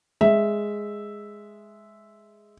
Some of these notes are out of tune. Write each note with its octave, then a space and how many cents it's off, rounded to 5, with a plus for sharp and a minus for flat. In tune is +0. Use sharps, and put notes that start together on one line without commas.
G#3 +0 E5 -5